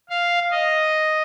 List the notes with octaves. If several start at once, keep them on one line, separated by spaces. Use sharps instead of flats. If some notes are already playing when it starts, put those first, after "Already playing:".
F5
D#5